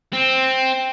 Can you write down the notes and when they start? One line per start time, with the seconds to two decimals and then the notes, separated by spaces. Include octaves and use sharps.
0.13 C4